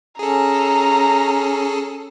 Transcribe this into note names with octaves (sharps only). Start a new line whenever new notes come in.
C#4 G#4 A4 A#5